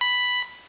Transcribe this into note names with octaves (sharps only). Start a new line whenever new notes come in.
B5